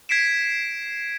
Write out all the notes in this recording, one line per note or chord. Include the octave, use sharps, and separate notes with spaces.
G#6 B6 C7 D7 E7